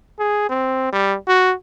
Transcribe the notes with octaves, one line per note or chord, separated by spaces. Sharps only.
G#4
C4
G3
F#4